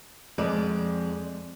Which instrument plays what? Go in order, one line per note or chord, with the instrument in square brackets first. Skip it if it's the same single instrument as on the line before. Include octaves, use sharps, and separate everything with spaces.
[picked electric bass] F2 [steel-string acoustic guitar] G#3 D5